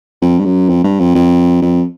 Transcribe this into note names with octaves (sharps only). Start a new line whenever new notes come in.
F2
G2
F#2
F2
G2
F2
F2
F2